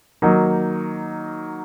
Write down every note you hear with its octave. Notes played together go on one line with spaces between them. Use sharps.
D#3 F#3 A#3 D#4